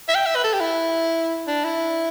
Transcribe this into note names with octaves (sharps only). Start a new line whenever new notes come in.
E5
G5
E5
B4
A4
G4
E4
D4
E4